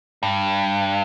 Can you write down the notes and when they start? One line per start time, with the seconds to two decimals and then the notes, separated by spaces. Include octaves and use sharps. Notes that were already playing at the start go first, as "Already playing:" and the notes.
0.23 G2